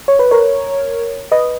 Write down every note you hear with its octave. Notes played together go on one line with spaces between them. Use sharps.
C#5
B4
A#4 C#5
B4 D#5